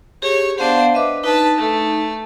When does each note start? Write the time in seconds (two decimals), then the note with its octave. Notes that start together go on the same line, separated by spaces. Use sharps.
0.22 G4 G#4 C#5
0.58 B3 D4 C5 F5 F#5
0.94 B4 D#5 E5 D6
1.24 D#4 B4 A5
1.59 A3